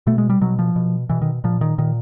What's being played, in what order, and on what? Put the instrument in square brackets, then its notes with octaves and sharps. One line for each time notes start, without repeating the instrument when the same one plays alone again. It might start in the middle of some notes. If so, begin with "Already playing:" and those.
[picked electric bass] B2 A3
G#3
G3
B2 F#3
F3
B2
B2 E3
D#3
A#2 F3
D#3
A#2 D#3